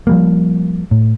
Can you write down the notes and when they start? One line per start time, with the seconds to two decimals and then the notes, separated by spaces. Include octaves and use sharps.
0.07 F3 G3 A#3
0.91 A2